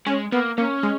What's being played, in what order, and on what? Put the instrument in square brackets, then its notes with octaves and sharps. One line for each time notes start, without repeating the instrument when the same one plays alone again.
[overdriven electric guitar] G#3 [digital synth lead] C#4
[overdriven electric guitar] A#3 [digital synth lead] B3
[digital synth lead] A#3 [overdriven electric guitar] C#4
[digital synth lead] G#3